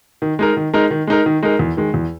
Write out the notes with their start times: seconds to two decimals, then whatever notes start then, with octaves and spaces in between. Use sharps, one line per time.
0.22 D#3
0.39 G#3 D#4 A#4
0.57 D#3
0.74 G#3 D#4 A#4
0.91 D#3
1.07 G#3 D#4 A#4
1.26 D#3
1.43 G#3 D#4 A#4
1.59 E2
1.77 D#3 G#3
1.94 E2